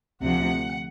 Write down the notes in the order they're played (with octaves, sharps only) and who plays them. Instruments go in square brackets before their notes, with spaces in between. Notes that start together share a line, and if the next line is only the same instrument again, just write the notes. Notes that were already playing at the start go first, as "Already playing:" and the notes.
[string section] D2 C3 F3 F#5